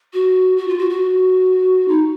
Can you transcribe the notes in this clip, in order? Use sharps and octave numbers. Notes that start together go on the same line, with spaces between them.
F#4
F#4
F4
F#4
F#4
D#4